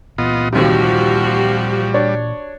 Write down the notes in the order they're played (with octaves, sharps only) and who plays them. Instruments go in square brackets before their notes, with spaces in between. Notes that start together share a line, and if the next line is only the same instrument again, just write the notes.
[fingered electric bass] A#2 E3 [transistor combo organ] B3 F4 D#5
[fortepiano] D#2 C3 [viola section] F3 F#4 G4 [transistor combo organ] G3
[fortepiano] D4 C#5